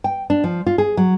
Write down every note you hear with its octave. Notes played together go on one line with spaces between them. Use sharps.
G5
D4
F3
F4
G#4
F#3